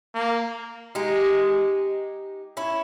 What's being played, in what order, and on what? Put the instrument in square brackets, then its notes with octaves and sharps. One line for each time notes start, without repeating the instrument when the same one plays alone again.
[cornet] A#3
[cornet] G#3 [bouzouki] D#4 G4
[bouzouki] C#4 E4